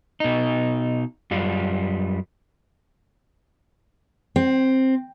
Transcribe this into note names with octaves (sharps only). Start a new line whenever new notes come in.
B2 D#4
F#2 G3 F4
C4